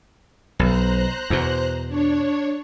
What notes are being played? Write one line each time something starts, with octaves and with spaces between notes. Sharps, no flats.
B1 C5 A#5 F#6
E2 B2
D4 C#5